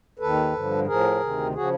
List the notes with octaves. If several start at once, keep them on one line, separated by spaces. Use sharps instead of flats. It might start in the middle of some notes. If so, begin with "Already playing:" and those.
D#2 D#3 A4 B4
G2 D3 F3
A2 F3 G#4 A#4
D2 C3 D#3
C#3 F3 F#4 G#4